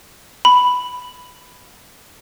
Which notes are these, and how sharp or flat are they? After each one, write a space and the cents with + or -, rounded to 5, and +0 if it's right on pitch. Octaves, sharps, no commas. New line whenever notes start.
B5 +5